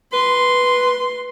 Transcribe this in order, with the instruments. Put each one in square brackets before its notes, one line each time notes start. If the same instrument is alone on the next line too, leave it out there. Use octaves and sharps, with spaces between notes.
[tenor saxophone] B4 [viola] C6